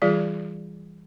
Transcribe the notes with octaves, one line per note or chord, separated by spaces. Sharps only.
E3 G3 F4 G#4 D5